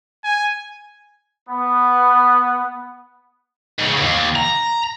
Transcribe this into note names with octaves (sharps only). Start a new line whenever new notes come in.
G#5
B3
G#2 C#3
D#2 G#2
A#5